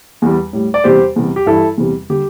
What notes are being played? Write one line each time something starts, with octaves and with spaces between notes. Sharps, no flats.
E2 E3 G3
A2 G3
D5
E2 C3 G3 G4 C5
E2 C3 G3
G4
G2 E3 G3 E4 A4
E2 C3 G3
D3 G3 G4